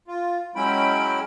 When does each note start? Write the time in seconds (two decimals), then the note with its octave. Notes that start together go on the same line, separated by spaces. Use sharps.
0.08 F4
0.56 F#3 G#3 C#4 E4 G5 B5